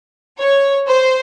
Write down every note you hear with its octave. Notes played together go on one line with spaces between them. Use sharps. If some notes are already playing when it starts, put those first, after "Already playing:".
C#5
C5